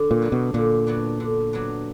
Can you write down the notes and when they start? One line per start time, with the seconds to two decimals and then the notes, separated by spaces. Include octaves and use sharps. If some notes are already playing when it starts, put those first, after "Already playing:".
Already playing: D3
0.11 A#2
0.22 F#3 B3 D4
0.32 B2
0.54 A#2 D3
0.87 F#3 B3 D4
1.20 D3
1.53 F#3 B3 D4